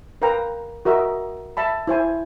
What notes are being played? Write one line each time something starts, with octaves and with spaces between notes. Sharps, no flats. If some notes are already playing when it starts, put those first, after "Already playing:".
A#4 B4 F5 G5 A#5
F#4 A#4 D#5 E5
E5 A5 B5
E4 C5 G#5